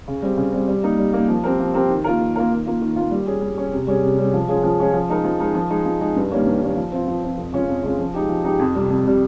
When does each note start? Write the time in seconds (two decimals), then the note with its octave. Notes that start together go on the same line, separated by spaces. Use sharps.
0.08 C#3
0.22 G3 C4
0.37 C#3
0.52 G3 C4
0.67 G3
0.83 A#3 D#4
0.98 G3
1.13 A#3 D#4
1.28 F3
1.44 C4 G4 A#4
1.60 F3
1.74 C4 G4 A#4
1.90 D#3
2.04 A#3 F4 A#4
2.21 D#3
2.36 A#3 F4 A#4
2.51 D#3
2.66 A#3 F4
2.81 D#3
2.96 A#3 F4
3.11 G3
3.26 C#4 G#4
3.42 G3
3.57 C#4 G#4
3.72 C3
3.87 G3 C#4 G#4
4.03 C3
4.18 G3 C#4 G#4
4.34 F3
4.48 G#3 C#4 F4 G#4
4.63 F3
4.79 G#3 C#4 F4 G#4
4.94 F3
5.09 G#3 D#4 A#4
5.24 F3
5.40 G#3 D#4 A#4
5.55 F3
5.70 G#3 D#4
5.85 F3
6.01 G#3 D#4
6.16 G2
6.32 D#3 G3 A#3 C#4
6.46 G2
6.61 D#3 G3 A#3 C#4
6.76 F3
6.92 C4 F4
7.07 F3
7.23 C4 F4
7.37 F2
7.52 C#3 G#3 C#4 F4
7.68 F2
7.83 C#3 G#3 C#4 F4
7.98 F3
8.14 G#3 D#4 G4
8.29 F3
8.44 G#3 D#4 G4
8.59 F2
8.75 C3 G3
8.90 F2
9.05 C3 G3